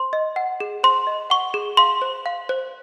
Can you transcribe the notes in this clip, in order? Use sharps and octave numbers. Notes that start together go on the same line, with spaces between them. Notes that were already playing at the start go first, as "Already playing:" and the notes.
Already playing: C5 C6
D#5
F#5
G#4
C5 C6
D#5
F#5 C#6
G#4
F5 C6
C5
F5
C5